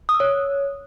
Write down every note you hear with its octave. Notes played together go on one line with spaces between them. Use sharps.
D#6
E6
C#5